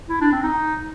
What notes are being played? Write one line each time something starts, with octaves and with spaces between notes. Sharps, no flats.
E4
D4
C4
D#4